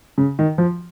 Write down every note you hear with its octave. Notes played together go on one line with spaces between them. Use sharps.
C#3
D#3
F3